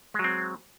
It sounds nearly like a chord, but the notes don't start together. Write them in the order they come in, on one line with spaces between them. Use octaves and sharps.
G#3 F#3 C4